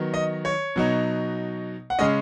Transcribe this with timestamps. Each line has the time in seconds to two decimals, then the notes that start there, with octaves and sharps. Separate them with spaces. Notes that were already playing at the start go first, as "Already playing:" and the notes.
Already playing: D#3 F#3 B3
0.14 D#5
0.45 C#5
0.76 B2 F#3 D#4
1.90 F#5
1.99 C#3 G#3 C#4 D#5